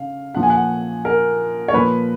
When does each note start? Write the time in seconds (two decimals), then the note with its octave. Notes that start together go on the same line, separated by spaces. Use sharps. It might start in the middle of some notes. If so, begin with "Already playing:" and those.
Already playing: C#3 F5
0.35 A#2 F3 F#5
0.43 G#5
0.50 F#5
1.05 A#4
1.68 C#5
1.73 A#2 F3 B4